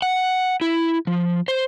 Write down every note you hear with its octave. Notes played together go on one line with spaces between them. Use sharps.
F#5
E4
F3
C5